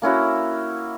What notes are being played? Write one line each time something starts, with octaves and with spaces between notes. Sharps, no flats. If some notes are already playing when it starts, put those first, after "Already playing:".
A#3 C#4 E4 F#4